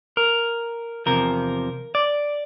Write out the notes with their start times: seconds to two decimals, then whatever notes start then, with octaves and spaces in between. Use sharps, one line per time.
0.17 A#4
1.06 E2 C3 F3 A#4
1.95 D5